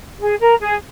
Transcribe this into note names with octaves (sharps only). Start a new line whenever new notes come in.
G#4
A#4
G#4